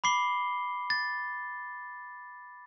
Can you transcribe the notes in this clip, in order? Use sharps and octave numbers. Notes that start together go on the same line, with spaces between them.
B5 D6 C7 G7
A6